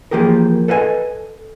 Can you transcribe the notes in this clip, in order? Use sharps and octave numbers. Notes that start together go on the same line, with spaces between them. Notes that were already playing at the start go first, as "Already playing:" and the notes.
E3 F3 A#3 G4 G#4 A#4
A4 B4 D#5 F5 G#5